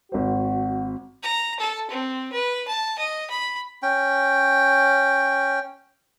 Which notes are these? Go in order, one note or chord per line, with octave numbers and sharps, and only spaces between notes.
G#1 F#4 C5
A#5
A4
C4
B4
A5
D#5
B5
C#4 G5